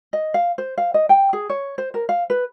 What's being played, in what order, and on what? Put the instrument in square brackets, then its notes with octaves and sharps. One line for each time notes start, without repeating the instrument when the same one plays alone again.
[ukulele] D#5
F5
C5
F5
D#5
G5
G#4
C#5
C5
A#4
F5
B4